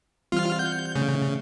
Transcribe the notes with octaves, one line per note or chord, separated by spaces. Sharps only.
E3 G3 C4 F4 F6
F#5 G6
C#3 A3